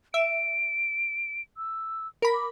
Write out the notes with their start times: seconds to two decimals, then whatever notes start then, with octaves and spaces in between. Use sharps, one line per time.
0.14 E5 D7
1.57 E6
2.22 A#4 B5
2.34 D6